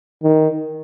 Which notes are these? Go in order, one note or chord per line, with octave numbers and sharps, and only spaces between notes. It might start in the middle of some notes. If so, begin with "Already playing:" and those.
D#3